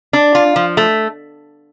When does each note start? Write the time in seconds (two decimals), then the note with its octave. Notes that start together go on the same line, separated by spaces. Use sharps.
0.13 D4
0.35 F4
0.56 F3
0.77 A3